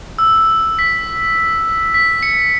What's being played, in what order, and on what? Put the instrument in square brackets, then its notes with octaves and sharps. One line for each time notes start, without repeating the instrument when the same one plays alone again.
[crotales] E6
B6
B6
C#7